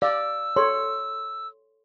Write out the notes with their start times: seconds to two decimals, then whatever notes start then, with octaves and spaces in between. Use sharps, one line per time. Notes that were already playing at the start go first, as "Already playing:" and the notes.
0.02 D5 F5 E6
0.56 A4 C#5 C6